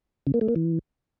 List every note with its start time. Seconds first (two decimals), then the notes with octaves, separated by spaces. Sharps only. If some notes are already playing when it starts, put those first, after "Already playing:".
0.27 C#3
0.34 A#3
0.41 A3
0.48 A#3
0.56 E3